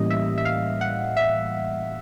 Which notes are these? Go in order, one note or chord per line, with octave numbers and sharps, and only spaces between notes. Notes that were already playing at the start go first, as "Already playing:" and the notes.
Already playing: A2 E3 G3 A#3 C#4 D#5
E5
E5
F5
F#5
E5